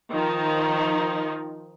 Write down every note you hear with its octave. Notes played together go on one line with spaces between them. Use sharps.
D#3 F3 D#4